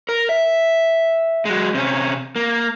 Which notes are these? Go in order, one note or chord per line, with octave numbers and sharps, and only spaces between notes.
A#4
E5
F#3 G#3
C3 C#4
A#3